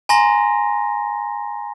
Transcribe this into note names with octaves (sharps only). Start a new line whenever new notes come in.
G#5 A#5 C6 A#6